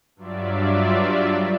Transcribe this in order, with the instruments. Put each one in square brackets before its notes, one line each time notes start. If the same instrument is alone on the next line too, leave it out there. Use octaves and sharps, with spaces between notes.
[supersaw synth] G2 F#3 F4 D5 E5